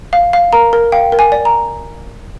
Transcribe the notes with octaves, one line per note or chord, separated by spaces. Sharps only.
F5
F5
A#4 A#5
A#4
F5 G5
A#4
G#5
D5
A#5